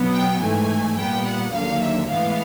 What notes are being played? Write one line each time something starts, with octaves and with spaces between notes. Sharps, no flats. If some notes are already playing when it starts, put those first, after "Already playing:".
Already playing: B2 F#3 B3
G5
G#2 E3 A3 G#5
A#2 G3 B3 G5
F#5
D#2 D3 F#3 A#3 F5
E5
A2 E3 G#3 B3 F5